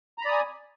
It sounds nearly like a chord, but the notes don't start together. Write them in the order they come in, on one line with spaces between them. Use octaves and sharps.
A#5 B5 D5 D#6 G#5